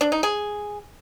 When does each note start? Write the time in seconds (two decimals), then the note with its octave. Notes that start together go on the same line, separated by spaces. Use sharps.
0.01 D4
0.12 D#4
0.23 G#4